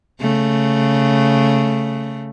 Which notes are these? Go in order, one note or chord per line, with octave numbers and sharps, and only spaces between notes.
C#3 A3